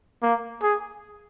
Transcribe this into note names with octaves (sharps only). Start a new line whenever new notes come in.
A#3
G#4